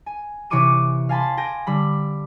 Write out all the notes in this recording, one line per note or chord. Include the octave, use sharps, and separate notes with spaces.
G#5
C3 E3 C#5 C#6 D6 D#7
F5 G#5 A5 B5 C6
G5 G#5 A#6
D3 G3 B5